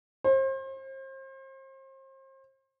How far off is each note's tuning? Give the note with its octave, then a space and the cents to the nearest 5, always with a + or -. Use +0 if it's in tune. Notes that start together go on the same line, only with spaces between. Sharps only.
C5 +35